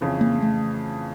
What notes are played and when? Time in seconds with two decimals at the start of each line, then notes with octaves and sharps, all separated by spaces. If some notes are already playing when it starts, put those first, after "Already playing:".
0.01 F2 C#3 E3
0.21 A#3
0.42 A3